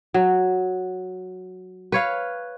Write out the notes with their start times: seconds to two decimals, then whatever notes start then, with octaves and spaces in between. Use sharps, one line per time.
0.14 F#3
1.92 B4 C#5 F5